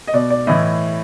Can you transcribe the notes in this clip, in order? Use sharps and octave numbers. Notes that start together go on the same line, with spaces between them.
D#5
B2 D5
D5
A2 E3 D#5